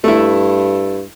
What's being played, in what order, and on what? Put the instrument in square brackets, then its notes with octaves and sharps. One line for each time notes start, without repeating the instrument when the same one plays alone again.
[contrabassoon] G2 [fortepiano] A3 E4